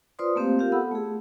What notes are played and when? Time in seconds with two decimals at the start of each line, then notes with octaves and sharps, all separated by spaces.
0.19 F4 B4 C5 D5 C6 D#6
0.35 A3 A#3 C4 G4 C5 F5
0.59 F4 G4 A#4 F5
0.72 B3 A4 F#5 B5 E6
0.92 A3 G#4